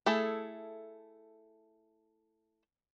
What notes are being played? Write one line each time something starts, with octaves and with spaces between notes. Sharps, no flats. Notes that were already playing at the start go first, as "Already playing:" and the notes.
A3 E4 G#4 A4